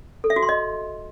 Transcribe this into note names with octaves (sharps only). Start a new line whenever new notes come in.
A4
E5
F#4
C6
D#5